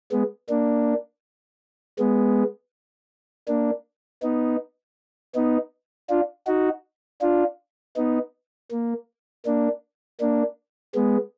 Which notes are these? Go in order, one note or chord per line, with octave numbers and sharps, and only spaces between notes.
G#3 B3
A#3 D4
G#3 B3
A#3 D4
B3 D#4
B3 D#4
D4 F4
D#4 F#4
D4 F4
B3 D#4
A#3
A#3 D4
A#3 D4
G#3 B3